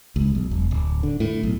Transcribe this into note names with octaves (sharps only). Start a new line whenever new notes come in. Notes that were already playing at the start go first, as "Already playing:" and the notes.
C#2
B1
E1
D1
D3
A2
B1